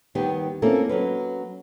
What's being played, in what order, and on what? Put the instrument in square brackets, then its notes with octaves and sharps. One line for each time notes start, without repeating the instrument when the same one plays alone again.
[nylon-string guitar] D#2 D#3 G3 B3 G4
A#3 C4 C#4 E4 F4 A4
F#3 C#4 B4